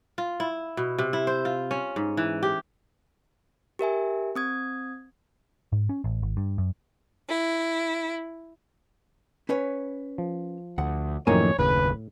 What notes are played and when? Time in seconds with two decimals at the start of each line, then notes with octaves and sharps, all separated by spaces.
0.18 F4
0.40 E4
0.77 B2
0.99 C3
1.13 E4
1.27 C5
1.45 F4
1.71 C#4
1.96 G#2
2.17 E3
2.43 G4
3.79 G4 A#4 E5 G#5
4.35 C4 D#6 G#6
5.72 G#2
5.89 C#4
6.04 A1
6.23 G#1
6.37 G2
6.58 F#2
7.28 E4
9.49 C#4 B4 C#5
10.18 F3
10.78 D2 F#5
11.27 F#2 A2 D#3 F3 A#3 C#5 G#5 A#5
11.59 F#1 D#2 A2 C#3 B4